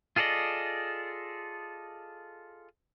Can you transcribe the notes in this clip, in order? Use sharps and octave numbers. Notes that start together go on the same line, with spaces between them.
F4 G#4 A4 D5 D#5